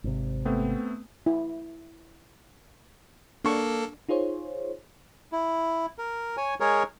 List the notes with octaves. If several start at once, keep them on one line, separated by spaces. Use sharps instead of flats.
G#1 C3
A3 B3 C4
E4
A#3 D4 A4 C#6
D#4 F4 G#4 C5 C#5
E4
A#4
C#5 G#5
G#3 G#4 A#4 C#5